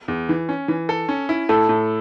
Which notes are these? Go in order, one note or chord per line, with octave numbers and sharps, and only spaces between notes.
E2
E3
C#4
E3
A4
C#4
E4
A2 A4
A2